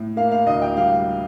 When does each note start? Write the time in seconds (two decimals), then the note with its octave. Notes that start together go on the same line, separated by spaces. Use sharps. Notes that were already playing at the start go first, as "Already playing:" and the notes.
Already playing: A2
0.17 A#3 F5
0.32 F5
0.46 D2 D#5
0.61 G5
0.76 G3 F5